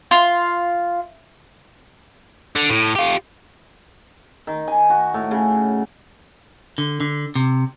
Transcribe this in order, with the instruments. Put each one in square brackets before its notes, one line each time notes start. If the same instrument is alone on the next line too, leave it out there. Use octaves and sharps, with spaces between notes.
[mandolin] F4
[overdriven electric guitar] D3
A2
F4 G4
[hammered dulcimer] D#3
G#5
F#4
A2
C#3
[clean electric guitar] D3
D3
C3